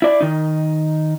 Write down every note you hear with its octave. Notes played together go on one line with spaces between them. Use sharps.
E4 D5
D#3 D#4